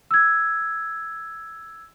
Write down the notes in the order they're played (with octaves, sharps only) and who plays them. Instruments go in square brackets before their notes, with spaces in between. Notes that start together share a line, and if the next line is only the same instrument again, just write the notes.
[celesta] E6 G#6